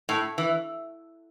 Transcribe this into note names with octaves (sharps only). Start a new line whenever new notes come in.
A2
E3